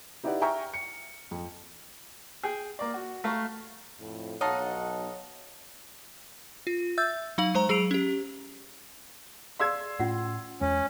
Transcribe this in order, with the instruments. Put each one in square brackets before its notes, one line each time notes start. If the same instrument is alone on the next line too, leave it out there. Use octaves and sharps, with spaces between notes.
[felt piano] D#4 E4 G4 B4 D5 F#5
E5 G5 G#5 A#5 C#6 F6
C#7
F2
[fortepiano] G#4 G5
A#3 D5
F#4
A3 F5 A#5 C#6
[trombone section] F2 A2
[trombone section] B1 [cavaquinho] D#4 D#5 F5 [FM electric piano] C#5 A5 [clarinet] F#5
[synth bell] F4
E5 E6 G6 A6
F#3 D#4 F5 F#7
G#3 C5 A#5
F#3 G#4 E6 C7 D7 F7
C#4 G4
[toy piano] G#4 D5 F5 [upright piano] C6 E6 G#6
[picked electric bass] A2 [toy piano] C#4 F4 F#5
[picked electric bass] E2 G#3 [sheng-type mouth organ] C#4